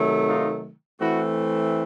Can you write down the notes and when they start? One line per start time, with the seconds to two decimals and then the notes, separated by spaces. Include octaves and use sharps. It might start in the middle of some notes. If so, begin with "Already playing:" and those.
Already playing: C3 D#3 F#3 A3
0.27 D#4 F4
1.00 E3 A3 C4 E4 F#4